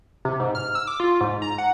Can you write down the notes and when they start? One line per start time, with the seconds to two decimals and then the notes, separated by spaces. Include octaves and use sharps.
0.25 C3
0.40 G#2
0.55 F6
0.75 E6
0.87 D6
1.00 F4
1.21 G#2
1.42 A#5
1.58 F#5